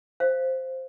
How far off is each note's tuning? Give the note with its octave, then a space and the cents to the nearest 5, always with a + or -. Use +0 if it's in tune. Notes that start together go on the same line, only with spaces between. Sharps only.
C5 +0 F5 -25